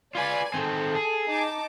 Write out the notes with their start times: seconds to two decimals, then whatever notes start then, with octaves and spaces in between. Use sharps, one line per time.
0.15 F4 B4 D5 G#5
0.54 D#3 C4 A4
0.95 G#4
1.29 D#4 A5 D6